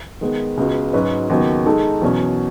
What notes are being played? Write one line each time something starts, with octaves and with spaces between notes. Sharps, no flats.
D#3 G#3 B3
C#2 C#3 G#3 B3 F#4
G#2 F#3 C#4 F#4 B4
D#2 C#3 F#3 B3
D#3 G#3 D#4 A4
E2 B2 F#3 C#4